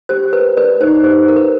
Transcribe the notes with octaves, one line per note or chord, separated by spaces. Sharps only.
G4 C5
A#4 B4
B4 D5
D#4 C5
G4 C5
A#4
B4